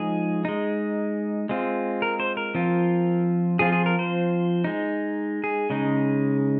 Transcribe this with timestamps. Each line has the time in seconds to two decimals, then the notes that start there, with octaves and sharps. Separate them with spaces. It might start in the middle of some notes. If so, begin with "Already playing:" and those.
Already playing: F3 G#3 D#4 G#4
0.45 G#3 D#4
1.49 G#3 C4 F4
2.02 A#4
2.20 C5
2.37 A#4
2.55 F3 C4 F4
3.59 F3 C4 F4 G#4
3.72 G#4
3.86 A#4
3.99 C5
4.64 G#3 D#4
5.44 G#4
5.70 C#3 G#3 D#4